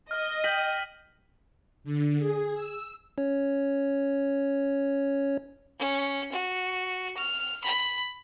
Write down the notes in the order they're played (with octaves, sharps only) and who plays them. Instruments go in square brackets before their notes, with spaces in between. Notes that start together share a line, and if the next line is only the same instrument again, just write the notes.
[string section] D#5 [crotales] F6
[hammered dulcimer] G5 [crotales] B6 D#7 F#7
[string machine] D3
G#4
E6
[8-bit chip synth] C#4 C#5
[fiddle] C#4
F#4
F6
B5